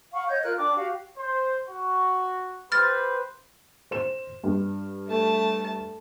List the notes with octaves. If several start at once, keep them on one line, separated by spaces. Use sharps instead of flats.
F5 F#5 B5 C#6
C#5 D#5 G6
F4 A#4 F6 F#6
D4 D5 G5 D6
F#4 G4 F5
C5
F#4
G4 B4 C5 F6 A6
C5 E7
G2
A3 A5